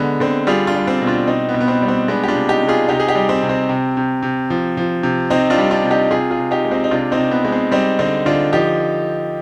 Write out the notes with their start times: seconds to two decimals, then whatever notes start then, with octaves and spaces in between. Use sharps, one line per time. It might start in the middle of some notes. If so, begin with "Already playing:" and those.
Already playing: D3 G#3 B3
0.20 D3 C4
0.47 G3 F4 G#4
0.67 D4 F4
0.75 G3
0.87 C4
1.02 B2
1.07 D4 F4
1.27 B2 C4 D#4
1.49 B3
1.54 B2
1.61 B3
1.68 C4
1.82 G3
1.88 C4
2.08 G#3 B3 D4
2.24 G4
2.28 D4 F4
2.35 C3
2.48 D#4 G4
2.62 C3
2.68 F4 G#4
2.88 C3 D#4 G4
3.00 G#4
3.08 D#4 G4
3.15 G3
3.29 C4
3.42 C3
3.49 C4
3.69 C3
3.97 C3
4.23 C3
4.50 F3
4.77 F3
5.03 C3
5.30 C3 C4 D#4
5.50 D4 F4
5.58 G3
5.71 D4 F4
5.84 C3
5.91 D#4 G4
6.11 C3 F4 G#4
6.31 F4 G#4
6.38 C3
6.51 D#4 G4
6.65 G#3
6.71 C4 D#4
6.84 D#4
6.91 C3 D4 F4
7.12 C4 D#4
7.18 C3
7.31 B3
7.45 G#3
7.52 C4
7.71 G3 C4 D#4
7.99 D3 C4 D#4
8.26 D3 D4 F4
8.52 F3 D#4 G4